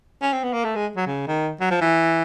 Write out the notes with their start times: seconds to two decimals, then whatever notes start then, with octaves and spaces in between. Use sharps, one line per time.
0.22 C#4
0.33 C4
0.44 B3
0.53 A#3
0.64 A3
0.75 G#3
0.96 F#3
1.06 C#3
1.27 D#3
1.60 F#3
1.70 F3
1.81 E3